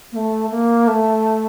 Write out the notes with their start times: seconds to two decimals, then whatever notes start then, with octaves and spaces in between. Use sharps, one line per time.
0.12 A#3
0.16 A3
0.51 A#3
0.87 A3